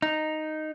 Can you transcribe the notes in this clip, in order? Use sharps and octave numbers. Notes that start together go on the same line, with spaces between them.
D#4